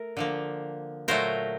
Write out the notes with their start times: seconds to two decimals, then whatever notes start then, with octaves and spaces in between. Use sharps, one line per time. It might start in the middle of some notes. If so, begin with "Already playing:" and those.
Already playing: A3 A#4
0.17 D3 F3 A#3
1.08 A#2 F#3 A3 A#4 C5